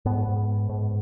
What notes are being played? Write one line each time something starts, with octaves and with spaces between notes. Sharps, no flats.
G#2 B3
G#2